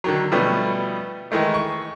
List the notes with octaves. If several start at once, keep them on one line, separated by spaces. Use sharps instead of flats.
D3 D#3 F#3
B2 F3 G3 A3 B3 C#4
D#3 E3 G#3 A3 D#4
C#6